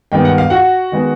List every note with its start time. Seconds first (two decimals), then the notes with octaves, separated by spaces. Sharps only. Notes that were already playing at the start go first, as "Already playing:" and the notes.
0.12 G2 D#3 G#3 B3 G5
0.25 F#5
0.38 F5
0.50 F#4 F#5
0.92 D#3 G#3 B3